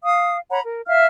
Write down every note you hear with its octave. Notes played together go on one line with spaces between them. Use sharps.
F5 D#6
C#5 F#5 A#5 B5
A#4
E5 F5 F6